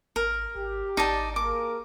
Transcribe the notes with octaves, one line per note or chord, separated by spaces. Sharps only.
G#1 A#4
G#1 G4
G#1 D#4 D5 A5
A#3 G#4 A#4 D6